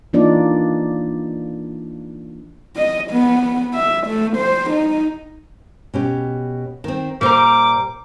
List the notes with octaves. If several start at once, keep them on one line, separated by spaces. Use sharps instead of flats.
E3 A#3 D4 D#4 F4 D5
D#5
B3
E5
A3
C5
D#4
B2 C#4 G4
D#3 C4
A#2 G3 A#4 C5 D6